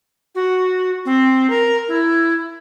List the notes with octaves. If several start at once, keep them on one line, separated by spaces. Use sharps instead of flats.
F#4
C4
A#4
E4